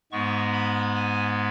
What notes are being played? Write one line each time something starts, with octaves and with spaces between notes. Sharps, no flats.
G#2 G#3 B3 C#6
B5
G#5